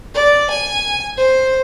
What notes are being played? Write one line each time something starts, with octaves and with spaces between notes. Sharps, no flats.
D5
G#5
C5